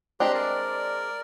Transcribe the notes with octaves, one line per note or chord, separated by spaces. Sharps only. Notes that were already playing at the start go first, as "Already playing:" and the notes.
G#3 C4 D4 G4 A#5 C6
A#4 D5